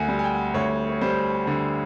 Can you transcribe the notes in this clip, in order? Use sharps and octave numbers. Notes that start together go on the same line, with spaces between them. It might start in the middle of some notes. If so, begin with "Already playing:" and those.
Already playing: D2 F#5 G#5
G3
G#5
G5
D2 C#5
C#5
G3 C5
D3